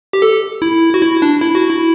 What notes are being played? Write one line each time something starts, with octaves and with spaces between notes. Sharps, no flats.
G4
A4
E4
F#4
E4
D4
E4
F#4
E4